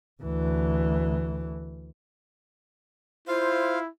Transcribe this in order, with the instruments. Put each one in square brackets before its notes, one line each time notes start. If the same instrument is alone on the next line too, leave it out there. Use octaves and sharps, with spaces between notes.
[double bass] D2 E3
[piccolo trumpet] E4 [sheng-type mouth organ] F4 F5 [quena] C5